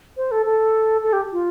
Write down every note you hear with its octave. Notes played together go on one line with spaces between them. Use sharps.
C5
A4
A4
A4
G4
F4